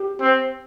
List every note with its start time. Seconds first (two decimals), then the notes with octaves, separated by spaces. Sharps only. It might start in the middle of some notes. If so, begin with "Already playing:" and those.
Already playing: G4
0.20 C4